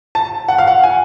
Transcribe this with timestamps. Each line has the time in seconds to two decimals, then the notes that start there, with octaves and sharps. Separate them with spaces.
0.15 A5
0.48 F#5
0.58 F5
0.67 F#5
0.83 G#5